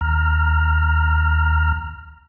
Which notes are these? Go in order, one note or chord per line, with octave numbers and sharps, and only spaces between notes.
D#2 A#5 F6